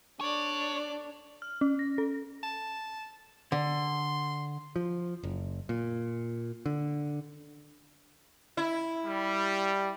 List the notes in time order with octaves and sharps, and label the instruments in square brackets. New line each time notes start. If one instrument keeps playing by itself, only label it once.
[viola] D4 [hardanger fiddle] A4 D5 [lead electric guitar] C#5
[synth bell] F6
C#4
A#6
A4
[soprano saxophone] A5
[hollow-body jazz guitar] D3 [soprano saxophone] C6
[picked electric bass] F3
F#1
A#2
D3
[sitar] E4
[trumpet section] G3